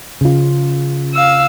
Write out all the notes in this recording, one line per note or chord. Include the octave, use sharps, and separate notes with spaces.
C#3 F4
F5 E6